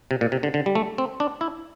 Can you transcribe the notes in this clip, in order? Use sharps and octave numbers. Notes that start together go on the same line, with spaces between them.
C3
A#2
C3
D3
D3
G3
A3
C4
D4
E4